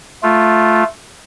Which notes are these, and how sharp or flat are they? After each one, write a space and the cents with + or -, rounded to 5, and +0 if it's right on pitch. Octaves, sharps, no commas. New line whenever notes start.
A3 +0 F4 +0